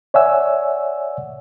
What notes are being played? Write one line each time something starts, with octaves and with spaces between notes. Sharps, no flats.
C#5 D5 E5 F#5 G#5 E6